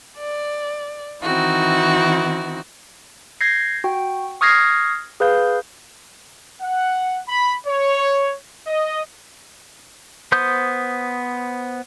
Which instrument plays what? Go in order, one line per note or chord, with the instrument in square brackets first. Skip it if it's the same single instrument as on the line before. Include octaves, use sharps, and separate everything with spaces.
[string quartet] D5
D#3 E3 C4 D#4 E4 F#4
[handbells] G6 G#6 A#6 C7
F#4 G5
C#6 D#6 F6 G#6 A#6 C7
G#4 B4 F5 G6
[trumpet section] F#5
B5
C#5
D#5
[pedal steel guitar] B3 C5 D#6 G6